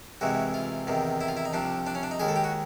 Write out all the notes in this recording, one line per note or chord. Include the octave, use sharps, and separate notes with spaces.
C2 C3 E3 G#3 F#4
F4
E2 C3 D#3
E4
F4
E4
D#4
C2 C3 F3 D4
D4
C#4
D4
D#4
D#2 D#3 G#3 G#4
A4
G4
F#4